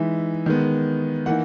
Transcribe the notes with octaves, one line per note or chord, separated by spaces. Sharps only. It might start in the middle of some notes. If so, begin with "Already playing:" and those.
Already playing: E3 G#3 D#4 E5
D#3 G#3 B3
E3 A#3 D#4 F#5